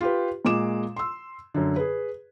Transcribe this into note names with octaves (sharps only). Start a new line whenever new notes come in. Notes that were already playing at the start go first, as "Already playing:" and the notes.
F4 G4 B4
A#2 G#3 D6 E7
C6 E6
F#2 D3
G#4 B4